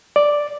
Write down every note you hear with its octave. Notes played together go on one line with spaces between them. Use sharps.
D5